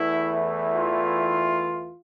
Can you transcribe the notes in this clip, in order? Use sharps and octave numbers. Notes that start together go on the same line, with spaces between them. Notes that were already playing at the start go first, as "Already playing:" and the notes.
Already playing: E2 E3 A3 E4
F4